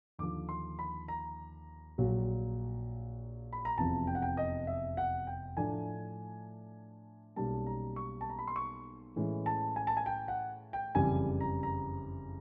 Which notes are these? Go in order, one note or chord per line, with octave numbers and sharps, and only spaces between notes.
D#2 D3 F3 D6
C6
B5
A#5
A#1 A#2 F#3
B5
A#5
F1 E2 C3 F3 A5
G5
F#5
G5
D#5
E5
F#5
G5
A2 F3 A3 D4 G#5
B1 B2 G3 A#3 C#4 A5
A#5
C#6
A5
A#5
B5
C6
C#6
A2 E3 G#3 C#4
A5
G#5
A5
G#5
G5
F#5
G5
F#1 F2 C#3 E3 G3 G#5
A#5
A#5